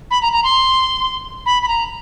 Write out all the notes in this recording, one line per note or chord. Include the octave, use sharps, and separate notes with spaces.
B5
A#5
A#5
C6
B5
B5
A#5